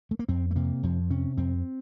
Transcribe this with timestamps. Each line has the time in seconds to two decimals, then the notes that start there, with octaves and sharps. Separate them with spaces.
0.11 A3
0.19 A#3
0.28 F2 C4
0.51 A3
0.56 C3 A#3
0.83 F2 F3
1.10 C3 C#4
1.37 F2 C4